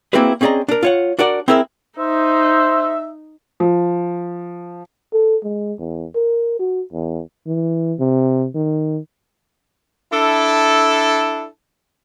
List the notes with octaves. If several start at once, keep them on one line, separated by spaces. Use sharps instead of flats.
A#3 C4 E4 F#4 G#4 B4
C4 C#4 G#4 D5 D#5 A#5
D4 A#4
F4 C#5 F#5
D4 F#4 A#4 D5 F#5
C4 E4 G#4 A#4 B4 E5
D#4 C5 E5
F3
A4
G#3
E2
A#4
F#4
E2
E3
C3
D#3
D4 E4 A4